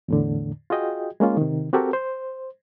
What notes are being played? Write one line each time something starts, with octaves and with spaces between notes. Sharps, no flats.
E2 A2 D3
F4 F#4 G#4 D#5 G5
G#3 A#3 C#4 F4
C3 D#3
C4 F#4 G4 A4 A#4
C5